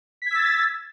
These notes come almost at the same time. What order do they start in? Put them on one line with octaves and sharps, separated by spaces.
B6 G#6 E6 A6